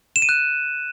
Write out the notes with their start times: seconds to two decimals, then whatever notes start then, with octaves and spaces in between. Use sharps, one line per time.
0.16 E7
0.22 D#7
0.29 F#6